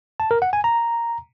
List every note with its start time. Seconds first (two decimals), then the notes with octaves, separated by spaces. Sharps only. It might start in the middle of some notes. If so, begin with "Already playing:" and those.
0.20 A5
0.31 A#4
0.42 F#5
0.53 G#5
0.64 A#5